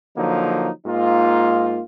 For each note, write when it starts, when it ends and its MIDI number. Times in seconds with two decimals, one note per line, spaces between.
0.17 0.70 50
0.17 0.70 53
0.17 0.70 54
0.17 0.70 58
0.17 0.70 63
0.86 1.81 44
0.86 1.81 58
0.86 1.81 63
0.86 1.81 65